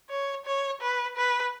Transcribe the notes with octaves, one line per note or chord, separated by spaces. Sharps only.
C#5
C#5
B4
B4